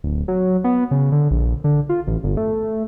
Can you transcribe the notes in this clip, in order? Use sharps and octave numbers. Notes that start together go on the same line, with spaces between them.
D1
F#3
B3
C#3
D3
A#1
D3
F4
A1
G1
A3